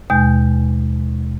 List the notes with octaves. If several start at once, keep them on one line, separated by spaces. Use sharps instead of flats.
D#2 B2 G#3 G#5 G6